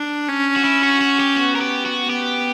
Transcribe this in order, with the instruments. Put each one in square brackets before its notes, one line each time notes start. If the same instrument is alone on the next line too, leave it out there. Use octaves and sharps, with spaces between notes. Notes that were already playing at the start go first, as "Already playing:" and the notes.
Already playing: [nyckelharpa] D4
C#4
[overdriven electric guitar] F#4
E4
F#4
F#4
G4
[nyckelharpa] B3 [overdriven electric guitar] F#4
[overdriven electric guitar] A#4
G4
F#4
[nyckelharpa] B3 [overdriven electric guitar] G4